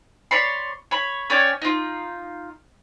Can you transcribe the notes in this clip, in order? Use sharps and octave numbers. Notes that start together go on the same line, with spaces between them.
C#5 D5 B5 C6
C#5 B5
C#4 C#5 D5 G5
D#4 F4